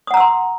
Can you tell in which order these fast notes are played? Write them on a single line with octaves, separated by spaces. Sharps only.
D#6 F#5 A#5 E6 C6